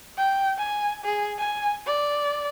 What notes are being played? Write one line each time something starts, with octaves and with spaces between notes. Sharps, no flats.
G5
G#5
G#4
G#5
D5